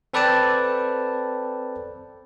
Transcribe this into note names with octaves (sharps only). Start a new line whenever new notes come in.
C4 A4 B4 D5 G5 A5